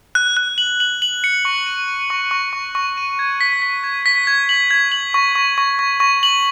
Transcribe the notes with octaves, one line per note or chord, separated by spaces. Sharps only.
F#6
F#6
F#7
F#7
F#7
C#7
C#6
D#7
D#7
C#6
C#6
C#6
C#6
D#7
G#6
B6
B6
G#6
B6
G#6
F#7
G#6
F#7
C#6
C#6
C#6
C#6
C#6
F#7